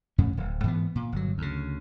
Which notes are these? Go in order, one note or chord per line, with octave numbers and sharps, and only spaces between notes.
F2 A2 C#4
D1
G#2 E3 B3
A#2
G1 F#3
D2 C#3